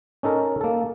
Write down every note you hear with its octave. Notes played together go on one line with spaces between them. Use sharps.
C#4 D#4 A4 A#4
A#3 A4